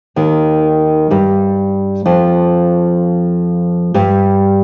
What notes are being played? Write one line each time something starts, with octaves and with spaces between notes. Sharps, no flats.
D#2 D#3
G2 G3
F2 F3
G2 G3